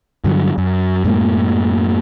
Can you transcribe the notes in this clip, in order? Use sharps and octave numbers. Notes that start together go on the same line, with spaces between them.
G2 D3 F#3
F#2
F#2 A2 G#3 A#3